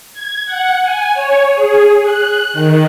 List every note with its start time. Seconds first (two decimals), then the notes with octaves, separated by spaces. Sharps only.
0.14 G#6
0.46 F#5
0.82 G#5
1.14 C#5
1.54 G#4
2.03 F#6
2.53 D#3